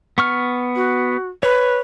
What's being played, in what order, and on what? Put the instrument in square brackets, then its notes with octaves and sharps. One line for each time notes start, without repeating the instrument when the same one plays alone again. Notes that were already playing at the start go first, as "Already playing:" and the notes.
[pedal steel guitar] B3 C#6 F6
[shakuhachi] F#4
[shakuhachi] B4 [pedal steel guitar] C#5